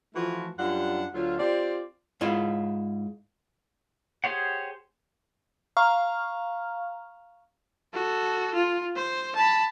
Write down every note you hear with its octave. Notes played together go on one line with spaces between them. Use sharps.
E3 F3 A3 F4 F#4
F#2 G3 D4 F4 F#5
D2 F#3 F4
C4 F4 G4 D5
G#2 E4 F4
G4 G#4 C5 C#5 F#5
F5 A#5 C#6 F6
F#4 A4
F4
C5
A5 B5